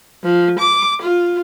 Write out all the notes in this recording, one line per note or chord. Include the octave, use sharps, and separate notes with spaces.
F3
D6
F4